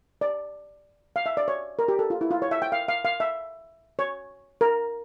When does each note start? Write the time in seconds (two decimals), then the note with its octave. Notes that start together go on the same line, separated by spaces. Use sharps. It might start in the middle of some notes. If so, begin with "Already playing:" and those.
0.21 D5
1.16 F5
1.26 E5
1.37 D5
1.48 C#5
1.79 A#4
1.88 G4
1.99 A4
2.10 F4
2.21 E4
2.31 F4
2.42 C#5
2.51 E5
2.62 G5
2.72 F5
2.88 F5
3.05 F5
3.20 E5
3.99 C#5
4.61 A#4